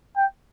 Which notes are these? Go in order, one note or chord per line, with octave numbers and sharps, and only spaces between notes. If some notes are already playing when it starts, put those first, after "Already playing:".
G5